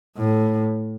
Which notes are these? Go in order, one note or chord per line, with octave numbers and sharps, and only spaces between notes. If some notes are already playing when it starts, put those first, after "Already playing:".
A2